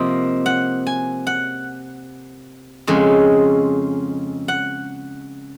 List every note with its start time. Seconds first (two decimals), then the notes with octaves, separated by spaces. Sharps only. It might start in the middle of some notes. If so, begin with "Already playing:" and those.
Already playing: C3 F3 A#3 D#5
0.46 F#5
0.87 G#5
1.27 F#5
2.87 F2 C#3 G#3
4.48 F#5